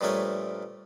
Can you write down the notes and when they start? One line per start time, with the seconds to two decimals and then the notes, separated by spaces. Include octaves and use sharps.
0.01 G2 A#2 F3 A3 A#4 C#5